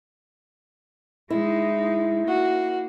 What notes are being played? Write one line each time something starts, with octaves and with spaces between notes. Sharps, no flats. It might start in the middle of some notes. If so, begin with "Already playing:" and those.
G#3 D#4 E4
A#3 F#4